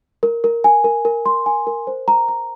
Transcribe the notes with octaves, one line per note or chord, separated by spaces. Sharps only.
A#4
A#4
G#5
A#4
A#4
C6
G#5
A#4
C5
A#5
A#5